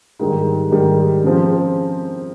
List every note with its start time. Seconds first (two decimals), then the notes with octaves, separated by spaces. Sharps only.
0.19 G#2 D#3 G3
0.71 G#2 D#3 G3
1.24 C#3 F3 C4